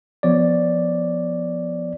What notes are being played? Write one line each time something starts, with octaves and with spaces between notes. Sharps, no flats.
F3 B3 C#5 D5